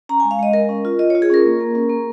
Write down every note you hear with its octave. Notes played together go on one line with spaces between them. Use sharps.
C#4 A#5
G#3 G#5
F5
G#3 D#5
G#3 A#4
C#4
F4
F4 D#5
F4 C#5
G#4
C#4 A#4
A#3
A#3
C#4
A#3